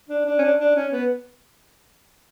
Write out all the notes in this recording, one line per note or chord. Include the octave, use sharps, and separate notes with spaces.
D4
D4
C#4
D4
D4
C#4
B3